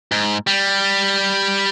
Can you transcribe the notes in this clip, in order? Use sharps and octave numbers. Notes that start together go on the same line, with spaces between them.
G#2
G3